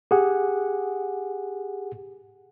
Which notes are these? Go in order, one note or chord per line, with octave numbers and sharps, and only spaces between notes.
G4 G#4 F#5